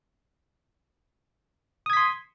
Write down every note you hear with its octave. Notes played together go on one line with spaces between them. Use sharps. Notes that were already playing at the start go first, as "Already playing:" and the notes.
C6 D#6 G#6 B6